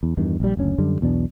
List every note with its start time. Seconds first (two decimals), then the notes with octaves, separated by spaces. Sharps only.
0.03 E2
0.17 E2 G2 D#3
0.40 A#1 G3
0.57 F#1 D2 C#4
0.78 F#2 D3 G3
1.01 B1 E2 B2 D4